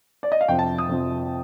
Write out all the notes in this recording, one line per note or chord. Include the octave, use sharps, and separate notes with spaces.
D5
D#5
F5
F2 C3 F3 G5
A5
D#6
F2 C3 F3